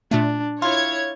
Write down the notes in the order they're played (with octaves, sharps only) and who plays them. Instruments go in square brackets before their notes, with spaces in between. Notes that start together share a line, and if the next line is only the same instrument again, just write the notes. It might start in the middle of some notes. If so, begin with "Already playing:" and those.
[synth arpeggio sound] A#2 A3 [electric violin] D4
[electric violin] E4 [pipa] F4 [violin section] C#5 G#6